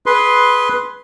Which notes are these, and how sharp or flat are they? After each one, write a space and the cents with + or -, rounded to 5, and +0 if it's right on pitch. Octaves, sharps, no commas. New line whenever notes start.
G#4 +15 B4 +0 C6 +0